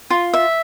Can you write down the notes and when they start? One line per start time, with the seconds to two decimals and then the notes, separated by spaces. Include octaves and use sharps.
0.10 F4
0.34 E5